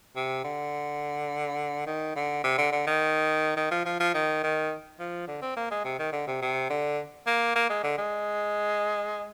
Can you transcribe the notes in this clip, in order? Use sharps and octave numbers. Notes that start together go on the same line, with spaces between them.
C3
D3
D#3
D3
C3
D3
D3
D#3
D#3
F3
F3
F3
D#3
D#3
F3
D3
C4
A#3
G#3
C3
D#3
D3
C3
C3
D3
A#3
A#3
G#3
D3
G#3